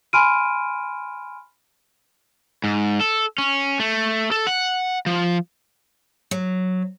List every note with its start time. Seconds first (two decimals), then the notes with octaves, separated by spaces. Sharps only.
0.13 G#5 B5 C6 F6 D7 D#7
2.64 G#2
3.00 A4
3.38 C#4
3.80 A3
4.31 A4
4.47 F#5
5.06 F3
6.31 F#3